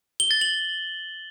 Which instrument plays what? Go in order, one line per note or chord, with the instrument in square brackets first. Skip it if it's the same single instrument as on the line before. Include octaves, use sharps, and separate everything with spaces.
[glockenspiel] G7
A6
F#7